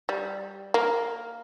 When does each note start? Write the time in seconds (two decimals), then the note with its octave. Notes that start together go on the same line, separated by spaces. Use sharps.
0.09 G3
0.74 A#3